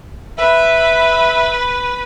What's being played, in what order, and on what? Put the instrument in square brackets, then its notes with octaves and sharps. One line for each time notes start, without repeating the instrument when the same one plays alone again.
[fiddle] B4 B5 [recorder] E5